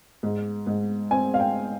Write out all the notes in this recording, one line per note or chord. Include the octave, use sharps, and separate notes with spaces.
G#2
G#2
C4 G#5
F5
G5